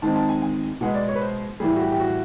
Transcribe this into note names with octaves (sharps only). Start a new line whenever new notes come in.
D#3 G#3 C4 A5
A5
G#5
G#5
B2 G#3 B3 F#5
D5
C#5
B4
C5
A2 E3 G3 G#4
F#4
G4
G4
F#4